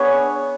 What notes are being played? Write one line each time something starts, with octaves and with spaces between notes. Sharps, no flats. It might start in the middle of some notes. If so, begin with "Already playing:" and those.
Already playing: B3 D4 G#4 C#5